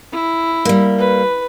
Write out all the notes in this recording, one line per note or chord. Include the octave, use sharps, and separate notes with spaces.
E4
G3 A#3
B4